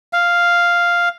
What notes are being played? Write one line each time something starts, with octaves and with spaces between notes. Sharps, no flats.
F5